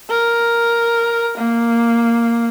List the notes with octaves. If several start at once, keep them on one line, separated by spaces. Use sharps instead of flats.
A#4
A#3